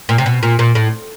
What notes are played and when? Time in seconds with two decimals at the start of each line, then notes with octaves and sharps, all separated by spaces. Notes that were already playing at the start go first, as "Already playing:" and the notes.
0.09 A#2
0.18 C3
0.26 B2
0.43 A#2
0.59 A#2
0.75 A2